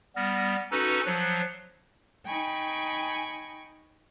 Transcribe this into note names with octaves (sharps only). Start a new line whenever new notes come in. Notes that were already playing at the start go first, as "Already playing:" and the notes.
G3 B3 F6 A#6
C#4 D#4 F#4 A4 B4
F3 F#3 F#6
D#4 G5 G#5 B5 C#6